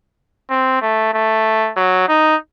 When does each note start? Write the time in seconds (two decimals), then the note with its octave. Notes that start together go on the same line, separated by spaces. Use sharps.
0.50 C4
0.82 A3
1.14 A3
1.77 F#3
2.09 D#4